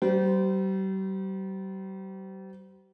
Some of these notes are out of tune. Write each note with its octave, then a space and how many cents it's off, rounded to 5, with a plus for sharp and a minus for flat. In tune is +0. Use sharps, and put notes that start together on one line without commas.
G3 -40 C5 -30